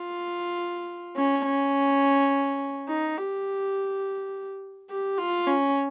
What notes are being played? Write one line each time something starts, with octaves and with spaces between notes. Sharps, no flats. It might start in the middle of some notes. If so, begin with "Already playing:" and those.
Already playing: F4
C#4
C#4
D#4
G4
G4
F4
C#4